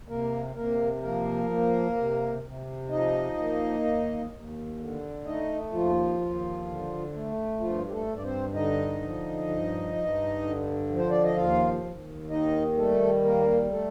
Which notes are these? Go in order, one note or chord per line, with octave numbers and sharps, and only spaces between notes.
C3 A#3 A#4
C3 A#3 A#4
F3 A#3 A#4
A#3
C3
C3
F3 D#4 D#5
A#3
D#2
D#2
D3
A3 D#4 D#5
D#2 F3 F4
D#2
D3
A3
G2 F3 F4
G4
A3 A4
G2
D5
C4 C5
D3 D#4 D#5
F3
G2
G2
D3
F3
C5
D5
D#5
D#2 F4 F5
D#2
D#3 D#4 D#5
G3 A3 A4
D#2 A#3 A#4
A3 A4